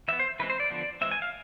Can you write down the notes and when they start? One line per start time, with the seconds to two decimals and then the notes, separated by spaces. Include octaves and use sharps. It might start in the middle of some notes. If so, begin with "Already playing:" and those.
0.08 E3 E5
0.12 B3
0.19 C5
0.40 E3 G#3 C4 B4
0.50 C5
0.60 D5
0.70 D3 F3 B3
1.01 E3 G#3 C4 E5
1.11 G#5
1.22 F5